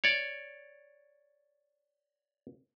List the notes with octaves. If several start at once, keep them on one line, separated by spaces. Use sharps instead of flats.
C#5 D5